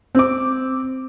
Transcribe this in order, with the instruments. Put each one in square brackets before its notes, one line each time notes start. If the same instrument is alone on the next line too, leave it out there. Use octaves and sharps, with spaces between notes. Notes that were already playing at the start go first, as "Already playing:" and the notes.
[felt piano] C4 D6